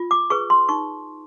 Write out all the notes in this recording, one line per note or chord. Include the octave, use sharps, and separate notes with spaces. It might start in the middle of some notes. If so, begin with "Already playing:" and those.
Already playing: F4
D6
G#4 B4 C#6
C6
D#4 C#6